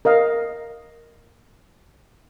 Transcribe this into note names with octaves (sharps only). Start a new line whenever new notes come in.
A#4 D#5 F5